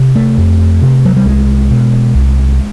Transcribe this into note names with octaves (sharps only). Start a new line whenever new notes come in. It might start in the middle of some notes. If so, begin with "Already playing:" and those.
Already playing: C3
A3
F2
C3
F#3
G3
C2 G#3
B2
C2